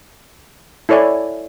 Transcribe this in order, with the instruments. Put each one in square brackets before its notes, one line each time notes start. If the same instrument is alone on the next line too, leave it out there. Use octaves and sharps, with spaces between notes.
[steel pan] E4 A4 C#5 D5 G#5